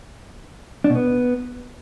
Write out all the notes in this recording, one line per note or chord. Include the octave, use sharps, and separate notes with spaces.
D4
B2
B3